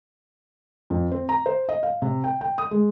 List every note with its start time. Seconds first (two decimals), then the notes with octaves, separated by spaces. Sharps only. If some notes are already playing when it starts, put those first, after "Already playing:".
0.90 F2
1.12 C4
1.29 A#5
1.46 C5
1.69 D#5
1.83 F5
2.02 C3
2.24 G5
2.41 G5
2.58 D#6
2.71 G#3